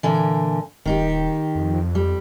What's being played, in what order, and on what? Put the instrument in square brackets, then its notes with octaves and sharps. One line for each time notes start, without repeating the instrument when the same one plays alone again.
[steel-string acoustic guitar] A#2 D3 E3
[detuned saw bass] D#1 [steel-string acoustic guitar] D#3 D#4 G4
[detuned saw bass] F2
[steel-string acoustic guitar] G3